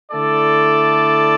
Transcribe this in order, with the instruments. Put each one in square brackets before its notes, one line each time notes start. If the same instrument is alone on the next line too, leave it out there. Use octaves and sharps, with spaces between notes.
[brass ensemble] D3 A3 E4 A4 D5